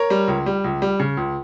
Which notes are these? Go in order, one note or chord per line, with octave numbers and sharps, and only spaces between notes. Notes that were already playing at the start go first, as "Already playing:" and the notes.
Already playing: A#4 C#5
G3
C#2
G3
C#2
G3
C#3
C#2